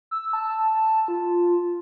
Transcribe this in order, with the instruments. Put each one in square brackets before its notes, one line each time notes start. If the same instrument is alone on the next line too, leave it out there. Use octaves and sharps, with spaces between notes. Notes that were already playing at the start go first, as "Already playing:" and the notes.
[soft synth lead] E6
A5
F4